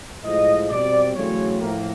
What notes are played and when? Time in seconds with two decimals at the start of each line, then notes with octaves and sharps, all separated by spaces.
0.24 A2 F3 G#3 D#5
0.70 B2 G3 C4 D5
1.15 E2 C#3 F#3 A3 C4 C#5
1.61 A2 F3 A#3